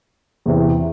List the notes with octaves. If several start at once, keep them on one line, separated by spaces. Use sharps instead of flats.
E2 C3 E3